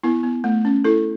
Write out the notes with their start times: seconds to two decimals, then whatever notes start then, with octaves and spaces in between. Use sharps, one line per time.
0.03 B3 E4
0.23 B3
0.44 A3
0.65 C#4
0.84 E4 A4